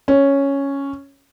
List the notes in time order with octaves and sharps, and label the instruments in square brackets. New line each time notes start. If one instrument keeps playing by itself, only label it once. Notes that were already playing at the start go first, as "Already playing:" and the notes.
[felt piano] C#4